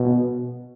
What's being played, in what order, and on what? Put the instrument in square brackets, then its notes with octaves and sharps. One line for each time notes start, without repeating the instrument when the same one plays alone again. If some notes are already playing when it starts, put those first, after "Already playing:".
Already playing: [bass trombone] B2